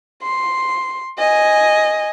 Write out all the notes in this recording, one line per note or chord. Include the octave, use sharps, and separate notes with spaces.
C6
D#5 G#5